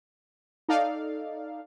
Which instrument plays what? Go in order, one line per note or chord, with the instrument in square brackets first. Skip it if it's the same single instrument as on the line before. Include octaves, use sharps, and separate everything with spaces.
[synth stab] D#4 A4 D5 F5